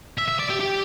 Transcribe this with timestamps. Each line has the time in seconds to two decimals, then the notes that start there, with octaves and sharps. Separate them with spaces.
0.18 E5
0.28 E5
0.39 D5
0.50 G4
0.60 G4